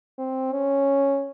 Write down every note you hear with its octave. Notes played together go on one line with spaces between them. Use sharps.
C4
C#4